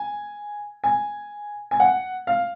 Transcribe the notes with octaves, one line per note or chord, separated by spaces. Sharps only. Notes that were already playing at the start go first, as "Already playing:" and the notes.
Already playing: G#5
G#5
G#5
F#5
F5